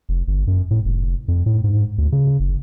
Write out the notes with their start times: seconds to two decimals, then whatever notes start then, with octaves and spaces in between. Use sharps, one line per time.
0.09 F1
0.27 G1
0.47 F#2
0.71 A2
0.85 F1
1.28 F2
1.46 A2
1.64 G#2
1.98 D2
2.12 C#3
2.40 F#1